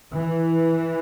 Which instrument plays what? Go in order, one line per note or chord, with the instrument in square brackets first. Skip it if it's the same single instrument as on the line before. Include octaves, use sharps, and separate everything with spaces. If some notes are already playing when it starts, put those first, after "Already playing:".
[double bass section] E3